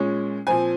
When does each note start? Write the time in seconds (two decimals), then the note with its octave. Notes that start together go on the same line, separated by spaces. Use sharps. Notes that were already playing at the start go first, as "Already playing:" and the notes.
Already playing: A#2 G#3 C#4
0.47 A#2 F3 C4 G#5